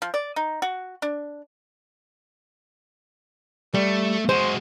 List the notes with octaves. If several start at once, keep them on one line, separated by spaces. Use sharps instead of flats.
F3
D5
D#4
F#4
D4
G3 A3
G#3 F#4 C5